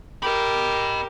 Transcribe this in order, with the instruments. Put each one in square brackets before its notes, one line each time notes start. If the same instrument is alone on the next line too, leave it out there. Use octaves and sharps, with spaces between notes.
[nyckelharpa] G4 A#4 [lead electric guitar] D#5 B5